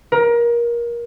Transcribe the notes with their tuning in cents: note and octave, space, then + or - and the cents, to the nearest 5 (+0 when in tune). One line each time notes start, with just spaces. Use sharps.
A#4 +25